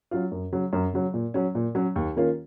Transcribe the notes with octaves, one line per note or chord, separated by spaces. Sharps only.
F#3 C#4 F4
F#2
C#3 F#3
F#2
C#3 F#3
A#2
F#3 C#4
A#2
F#3 C#4
D#2
D#3 A#3 C#4 F4